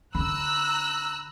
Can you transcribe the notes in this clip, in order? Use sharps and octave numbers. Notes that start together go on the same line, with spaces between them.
D3 D4 A#5 B5 E6 F#6